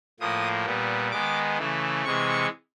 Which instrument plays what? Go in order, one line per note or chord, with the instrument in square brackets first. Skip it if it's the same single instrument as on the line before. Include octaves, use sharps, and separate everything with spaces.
[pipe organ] A2 F3 A#3 D#6
A#2 G3 B3
D#3 G#3 B3 D6
C#3 E3 A3
C3 E3 G#3 C#6